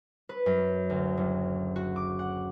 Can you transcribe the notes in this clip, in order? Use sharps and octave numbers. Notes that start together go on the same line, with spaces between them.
B4
F#2
D2
F#1
F#4
D6
F#5